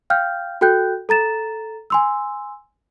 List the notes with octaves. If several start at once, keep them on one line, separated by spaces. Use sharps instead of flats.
F5 G5 F6 G6
F#4 A4 G5 F#6 G6
A4 A#5 A6 E7
G#5 C6 E6